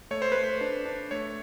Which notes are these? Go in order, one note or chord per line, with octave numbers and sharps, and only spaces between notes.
A3 C#5
C5
A3 B4
C5
D4
D4
A3 C#5